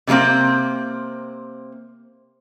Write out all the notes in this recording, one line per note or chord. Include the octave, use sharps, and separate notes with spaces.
C3 D#3 F#3 A#3 C4